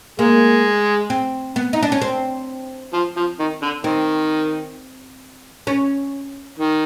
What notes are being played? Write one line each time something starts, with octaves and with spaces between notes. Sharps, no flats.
G#3 A#3
C4
B3
D#4
D4
C#4
C4
F3
F3
D#3
D3
D#3 C4
C#4
D#3